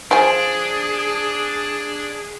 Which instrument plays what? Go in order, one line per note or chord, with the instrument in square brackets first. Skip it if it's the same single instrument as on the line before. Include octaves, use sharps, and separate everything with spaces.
[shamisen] F3 G#5 [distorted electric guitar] D4 [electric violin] G#4